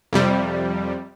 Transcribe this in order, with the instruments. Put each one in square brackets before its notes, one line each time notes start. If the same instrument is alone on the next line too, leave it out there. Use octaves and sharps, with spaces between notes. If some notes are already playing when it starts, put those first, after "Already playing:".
[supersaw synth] F2 C3 G3